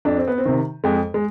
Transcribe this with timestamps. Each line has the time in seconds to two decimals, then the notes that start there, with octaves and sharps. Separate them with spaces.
0.05 F2 D4
0.17 C4
0.28 B3
0.38 C4
0.45 C3 D#3
0.84 F2 G#3
1.14 G#3